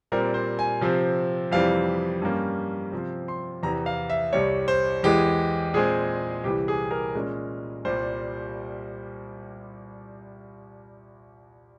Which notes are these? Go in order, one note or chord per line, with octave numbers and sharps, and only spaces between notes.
A#2 G3 C4 A#4
C5
G#5
C3 F3 C4
F2 C3 E3 G3 C4 F5
G2 G3 A#3 C#4
C3 F3 C4
C6
E2 C3 E3 A#5
F5
E5
C2 C3 G3 C#5
C5
E2 E3 G#3 G4
A#2 G#3 C4 G#4
C2 C3 E3 G4
G#4
A#4
A#2 G#3 C#4
C2 A#2 G3 C5